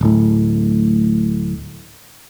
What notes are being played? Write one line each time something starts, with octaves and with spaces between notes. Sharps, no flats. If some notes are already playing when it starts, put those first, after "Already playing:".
D1 A2